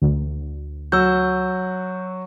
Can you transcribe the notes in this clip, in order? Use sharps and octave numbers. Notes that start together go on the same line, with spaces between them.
D2
F#3 F#4 E6 G6